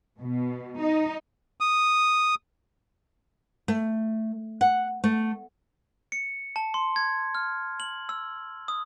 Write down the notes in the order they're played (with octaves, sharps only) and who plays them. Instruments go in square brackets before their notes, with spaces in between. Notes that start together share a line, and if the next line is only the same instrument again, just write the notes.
[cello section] B2
D#4
[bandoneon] D#6
[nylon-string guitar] A3
F#5
A3
[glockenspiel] C#7
A5
C6
G#6
F6
F#7
E6
D#6